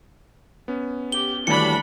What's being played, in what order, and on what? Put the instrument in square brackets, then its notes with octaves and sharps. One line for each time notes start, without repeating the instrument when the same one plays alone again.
[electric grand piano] B3 C#4
[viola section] G4 [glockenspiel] G7
[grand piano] D#2 F#3 [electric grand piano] E3 G3 A3 [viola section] D4 B5 [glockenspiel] C#7